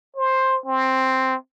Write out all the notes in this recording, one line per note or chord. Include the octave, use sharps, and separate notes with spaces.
C5
C4